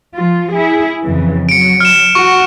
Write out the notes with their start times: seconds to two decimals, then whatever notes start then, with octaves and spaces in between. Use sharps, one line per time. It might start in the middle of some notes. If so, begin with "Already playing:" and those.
0.14 F3 F4
0.52 E4 G#4
1.03 F2 C#3 E3
1.49 F#3 C#7 D7
1.80 F6 E7
2.15 F#4 C#6